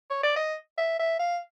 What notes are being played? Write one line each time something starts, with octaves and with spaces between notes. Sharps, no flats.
C#5
D5
D#5
E5
E5
F5